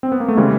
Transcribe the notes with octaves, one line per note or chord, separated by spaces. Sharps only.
C4
B3
A#3
A3
C#3 E3 G3 G#3